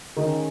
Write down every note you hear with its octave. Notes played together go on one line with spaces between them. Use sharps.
D#3 G#3 C#4 D#4